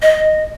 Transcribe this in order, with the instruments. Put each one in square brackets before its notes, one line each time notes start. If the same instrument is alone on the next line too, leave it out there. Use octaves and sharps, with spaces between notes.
[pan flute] D#5